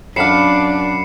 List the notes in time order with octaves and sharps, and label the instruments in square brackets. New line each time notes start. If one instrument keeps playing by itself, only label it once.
[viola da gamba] F#2 [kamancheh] D4 [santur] F5 F#5 B5 [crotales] C7 C#7 E7